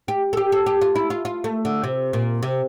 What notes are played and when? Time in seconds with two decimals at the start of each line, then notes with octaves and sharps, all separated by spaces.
0.08 G4
0.33 A4
0.37 G4
0.52 A4
0.66 G4
0.81 F4
0.95 E4
1.10 F4
1.25 F4
1.44 A3
1.65 D3
1.84 C3
2.13 A#2
2.43 C3